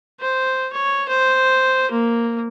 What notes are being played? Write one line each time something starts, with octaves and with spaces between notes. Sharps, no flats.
C5
C#5
C5
A#3